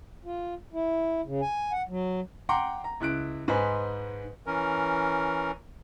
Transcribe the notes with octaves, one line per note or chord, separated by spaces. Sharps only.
F4
E4
C#3
G#5
F#5
F#3
F#5 G5 A#5 C6 D6
A#5
C#2 E4 F#6 D7
G#2 B4 C5 D#5 G#5
E3 C#4 A#4